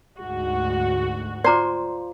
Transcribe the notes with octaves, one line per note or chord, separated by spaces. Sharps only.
D2 G#2 F#4
F4 C5 D5 A#5 D6